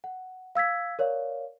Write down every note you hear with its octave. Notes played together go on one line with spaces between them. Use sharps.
F#5
F5 E6 G#6 B6
A#4 C#5 D5 F5